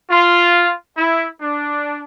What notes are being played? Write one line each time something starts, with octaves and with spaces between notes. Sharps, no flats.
F4
E4
D4